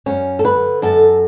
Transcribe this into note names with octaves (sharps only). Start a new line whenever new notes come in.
F#2 C#4
A4
D3 B4
F#2 A4